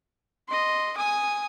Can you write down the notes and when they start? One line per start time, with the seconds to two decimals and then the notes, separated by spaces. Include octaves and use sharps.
0.49 D#5 C6
0.97 G#5 D#6